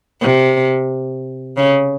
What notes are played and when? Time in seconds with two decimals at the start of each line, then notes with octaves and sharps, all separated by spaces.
0.21 C3
1.57 C#3